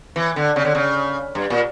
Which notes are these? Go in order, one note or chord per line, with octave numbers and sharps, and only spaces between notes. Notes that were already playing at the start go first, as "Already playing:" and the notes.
E3
D3
C#3
D3
C#3
G2
A#2